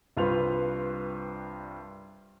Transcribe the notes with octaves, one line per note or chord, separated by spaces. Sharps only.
C2 G2 F4 B4 C5 F7